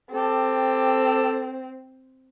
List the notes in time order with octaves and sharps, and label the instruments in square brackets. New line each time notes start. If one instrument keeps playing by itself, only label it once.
[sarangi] C4 [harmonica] G4 A4